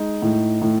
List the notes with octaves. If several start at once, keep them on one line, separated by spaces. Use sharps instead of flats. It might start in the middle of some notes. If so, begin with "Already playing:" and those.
Already playing: G#3 D#4
A2
A2